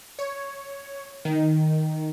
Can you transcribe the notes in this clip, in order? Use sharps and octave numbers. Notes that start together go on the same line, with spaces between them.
C#5
D#3